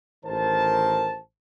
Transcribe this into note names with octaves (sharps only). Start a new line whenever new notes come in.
A1 D#3 A#4 C5 A5